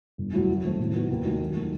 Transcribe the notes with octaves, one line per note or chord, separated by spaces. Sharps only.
G1
G2 F#3 A3 E4
F#2
D#3 A3 C4
A2
F#3 B3 D#4
D#2
D#3 A3 D#4 F#4
F#2
D#3 A3